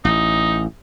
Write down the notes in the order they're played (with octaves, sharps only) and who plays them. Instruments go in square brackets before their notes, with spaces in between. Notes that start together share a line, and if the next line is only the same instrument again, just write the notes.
[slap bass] A1 [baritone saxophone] D#4